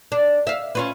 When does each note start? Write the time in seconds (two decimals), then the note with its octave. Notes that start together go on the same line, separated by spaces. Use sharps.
0.12 D4
0.47 E5 F5
0.75 C#4 F4 B4